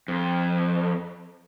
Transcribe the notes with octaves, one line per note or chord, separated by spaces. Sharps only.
F2